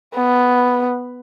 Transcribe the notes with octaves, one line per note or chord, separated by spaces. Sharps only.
B3